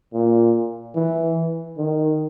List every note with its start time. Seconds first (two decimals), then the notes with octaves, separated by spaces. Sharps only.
0.13 A#2
0.95 E3
1.78 D#3